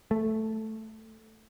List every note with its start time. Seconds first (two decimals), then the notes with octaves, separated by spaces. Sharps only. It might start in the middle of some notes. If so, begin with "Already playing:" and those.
0.11 A3